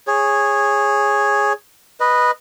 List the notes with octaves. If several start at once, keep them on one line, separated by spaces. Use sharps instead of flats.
G#4 C#5
B4 D#5